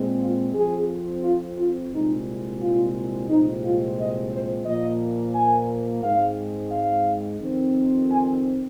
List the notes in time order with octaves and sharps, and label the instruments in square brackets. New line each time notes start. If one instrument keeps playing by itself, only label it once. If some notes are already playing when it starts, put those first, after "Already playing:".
Already playing: [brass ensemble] A#2 G#3 C4
F4
F2 F3 C4 G#4
F4
F4
C2 A#2 G#3 C4 D#4
F4
C2 A#2 F3 G#3 C4 D#4
F4
D#5
C5
A#2 F3 A#3 D#5
G#5
G#2 G#3 C4 F5
F5
F2 D#3 C4
G#5